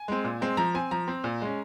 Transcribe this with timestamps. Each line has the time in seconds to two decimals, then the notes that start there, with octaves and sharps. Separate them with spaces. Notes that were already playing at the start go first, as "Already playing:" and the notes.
Already playing: G#5
0.08 G#3 C4
0.24 A#2
0.41 G#3 C4
0.57 F3 A#5
0.74 C4 G#5
0.91 F3 A#5
1.08 C4
1.24 A#2
1.42 G#3 C#4